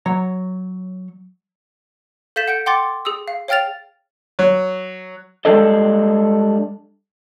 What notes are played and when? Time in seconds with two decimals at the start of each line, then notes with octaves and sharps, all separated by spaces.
0.06 F#3 C#5 A#5
2.36 A4 F5 G6 A6 B6 E7
2.48 F#5 G6 D7
2.66 F#5 G5 C6 D6 A6
3.05 G#4 D#6 E6
3.28 F5
3.48 C#5 F5 G5 F6 A6 F7
4.39 F#3
5.45 G3 G#3 D4 G#4 A4 D#5